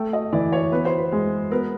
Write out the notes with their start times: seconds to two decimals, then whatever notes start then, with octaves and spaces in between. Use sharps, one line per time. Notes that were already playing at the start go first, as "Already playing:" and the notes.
Already playing: A3 G5
0.13 D#5
0.33 E3 D5
0.52 C#5
0.72 B3 B4
0.85 C5
0.98 B4
1.12 G#3
1.51 B3 A#4